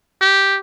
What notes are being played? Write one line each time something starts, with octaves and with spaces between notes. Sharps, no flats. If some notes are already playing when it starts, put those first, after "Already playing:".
G4